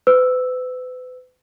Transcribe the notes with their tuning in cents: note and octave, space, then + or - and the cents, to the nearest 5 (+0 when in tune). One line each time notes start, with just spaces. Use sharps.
B4 +40 E6 +0